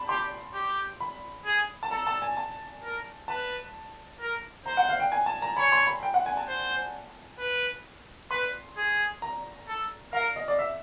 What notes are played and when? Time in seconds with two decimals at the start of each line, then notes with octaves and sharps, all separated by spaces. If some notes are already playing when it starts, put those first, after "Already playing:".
Already playing: A5 B5
0.09 G4 C6
0.54 G4
1.00 B5
1.45 G#4
1.83 A5
1.91 A4 A#5
2.07 A5
2.22 G#5
2.37 A5
2.84 A#4
3.28 B4 A5
4.20 A#4
4.66 C5 A#5
4.77 F#5
4.89 F5
5.00 G5
5.12 G#5
5.26 A5
5.42 A#5
5.57 C#5 B5
5.72 C6
5.87 B5
6.03 G5
6.14 F#5
6.26 G#5
6.37 A5
6.48 C5
7.39 B4
8.31 B4 C6
8.77 G#4
9.22 A#5
9.68 A4
10.13 A#4 F5
10.36 D#5
10.48 D5
10.59 E5